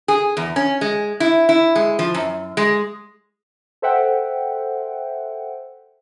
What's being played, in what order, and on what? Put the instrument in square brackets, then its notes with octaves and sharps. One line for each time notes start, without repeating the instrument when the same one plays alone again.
[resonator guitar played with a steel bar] G#4
E2
C#4
G#3
E4
E4
G#3
F3
F#2
G#3
[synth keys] A4 C5 E5 F#5 G5